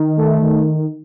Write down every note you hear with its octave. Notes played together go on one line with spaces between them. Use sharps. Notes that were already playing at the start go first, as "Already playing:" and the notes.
Already playing: D#3
A3
D#3